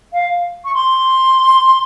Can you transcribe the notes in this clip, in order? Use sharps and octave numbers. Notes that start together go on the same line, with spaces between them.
F5
C#6
C6